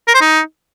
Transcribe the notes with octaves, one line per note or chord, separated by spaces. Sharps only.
A#4
C5
D#4